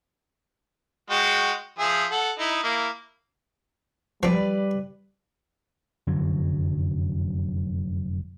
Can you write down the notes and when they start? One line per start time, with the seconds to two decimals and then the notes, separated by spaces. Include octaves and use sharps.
1.10 G#3 F#4 G5
1.79 F3 G#4 E5
2.11 A4 F#5
2.39 D#4 E4 D#5
2.63 A#3 E4
4.23 F3 G3 C4 B4 D5
6.07 F1 F#2 D3 F#3